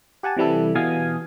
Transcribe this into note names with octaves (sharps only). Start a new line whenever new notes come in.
G4 F#5 G#5 A5
C3 E3 G3 E4 A4
B2 E3 B3 F5 G#5 D#6